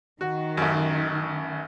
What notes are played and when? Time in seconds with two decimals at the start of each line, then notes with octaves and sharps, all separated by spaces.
0.21 D#3 F#4
0.57 A1 F#2